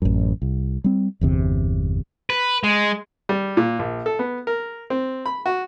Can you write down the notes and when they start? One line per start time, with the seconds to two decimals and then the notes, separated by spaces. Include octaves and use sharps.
0.02 A1 F#2
0.42 C2
0.84 G3 C4
1.21 G1 E2 C3
2.30 B4
2.64 G#3
3.29 G3
3.57 A#2
3.79 A#1
4.06 A4
4.19 B3
4.47 A#4
4.90 C4
5.26 B5
5.46 F#4